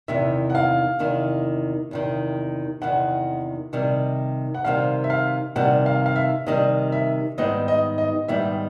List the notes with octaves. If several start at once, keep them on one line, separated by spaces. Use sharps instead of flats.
E2 C3 D#3 E5
F#5
F5
E2 C3 D#3
E2 C3 D#3
E2 C3 D#3 F#5
C3 D#3 G3
F#5
C3 D#3 G3 F5
E5
F5
C3 D#3 G3 F#5
F5
F5
E5
C3 D#3 G3 D#5
E5
G#2 D#3 G3 B3 D#4 D#5
D#5
D#5
G#2 D#3 G3 B3 D#4 E5